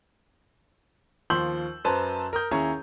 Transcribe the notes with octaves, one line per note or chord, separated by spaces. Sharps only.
D#2 F3 C6 E6 G6 F#7
F#2 B4 C5 A5 A#5
A#4 D#6 G6
D#2 C#4 E4 G#4 C#5 A#5